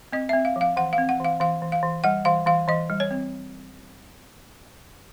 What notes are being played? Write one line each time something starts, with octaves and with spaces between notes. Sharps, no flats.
C4 D#5
C4 E5
F5
F3
F5
E3 F#5
F5
C4
F#5
E3 F5
E3 F5
E3
F5
E3
G3 F#5
E3 F5
E3 F5
E3 D#5
G3
C#5
C4